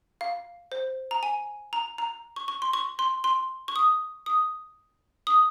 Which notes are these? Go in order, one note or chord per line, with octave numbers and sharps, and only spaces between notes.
F5
C5
A#5
G#5
A#5
A#5
C#6
C#6
C6
C#6
C6
C6
C#6
D#6
D#6
D#6